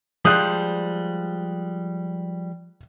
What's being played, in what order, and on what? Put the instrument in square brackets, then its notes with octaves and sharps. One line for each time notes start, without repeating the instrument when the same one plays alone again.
[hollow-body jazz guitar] F3 G3 G#3 [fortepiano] D#6 F#6